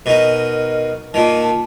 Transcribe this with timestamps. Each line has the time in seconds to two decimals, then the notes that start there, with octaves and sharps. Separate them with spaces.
0.06 B2 D#4 A#4
1.14 A#2 D#3 A5